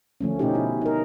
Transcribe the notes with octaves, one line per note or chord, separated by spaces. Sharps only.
D3 F3 A3 C#4
B2 C#4 D#4 G4
E4
D#4 A#4